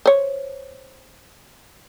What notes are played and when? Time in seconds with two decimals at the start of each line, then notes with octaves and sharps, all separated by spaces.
0.06 C5 C#5